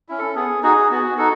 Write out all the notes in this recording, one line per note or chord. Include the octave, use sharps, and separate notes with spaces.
C#4 E4
A4
B3 G#4
D#4 F#4 G#4
B3 F#4
D#4 F#4 A4